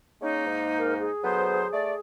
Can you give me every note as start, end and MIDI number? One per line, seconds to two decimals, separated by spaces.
0.22 1.09 56
0.22 1.09 58
0.22 0.45 61
0.22 1.09 63
0.46 1.09 44
0.78 0.94 70
1.00 2.00 68
1.24 1.68 38
1.24 1.68 54
1.24 1.63 59
1.24 1.68 72
1.73 1.94 57
1.73 1.94 74